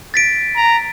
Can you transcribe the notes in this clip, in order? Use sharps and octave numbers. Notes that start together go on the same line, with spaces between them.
A6 B6 D7
A#5